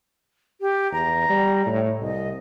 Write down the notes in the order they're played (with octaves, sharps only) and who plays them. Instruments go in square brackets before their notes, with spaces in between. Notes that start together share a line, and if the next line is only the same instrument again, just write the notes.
[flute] G4
[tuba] E2 [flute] A#5
[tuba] G3
A2
[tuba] C2 [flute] D#5